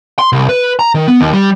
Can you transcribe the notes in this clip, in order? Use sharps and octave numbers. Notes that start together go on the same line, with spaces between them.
C6
C2
B4
A#5
D#3
B3
D#2
G3